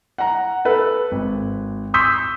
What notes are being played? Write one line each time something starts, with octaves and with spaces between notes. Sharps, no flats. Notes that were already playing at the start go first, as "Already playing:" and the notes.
F#5 A#5
A4 B4
G#1
C6 C#6 D#6 E6 G6 B6